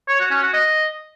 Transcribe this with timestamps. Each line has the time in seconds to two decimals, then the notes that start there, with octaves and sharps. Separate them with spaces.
0.09 C#5
0.20 F#4
0.31 C#4
0.42 F#4
0.53 D#5